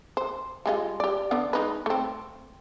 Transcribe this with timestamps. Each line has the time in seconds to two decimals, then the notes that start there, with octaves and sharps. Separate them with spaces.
0.17 C5
0.66 G3 G#3 F4
1.00 G4 D5
1.31 D3 B3 D5
1.53 G#3 D#4 B4
1.86 A3 C4